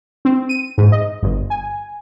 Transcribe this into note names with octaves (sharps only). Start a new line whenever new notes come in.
C4
D#7
G#2
D#5
G1
G#5